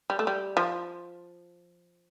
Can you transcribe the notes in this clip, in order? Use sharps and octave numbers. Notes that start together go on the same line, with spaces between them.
G3
A3
G3
F3